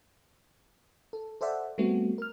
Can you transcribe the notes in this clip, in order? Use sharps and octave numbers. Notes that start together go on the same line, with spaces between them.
A4
A4 C5 D5 E5 F#5
G3 A3 B3 C4 F#4
A#4 F6